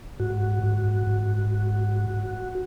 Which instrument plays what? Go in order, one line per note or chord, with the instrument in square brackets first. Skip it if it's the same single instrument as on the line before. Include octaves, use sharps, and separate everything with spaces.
[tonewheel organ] G#2 F#4
G#2
G#2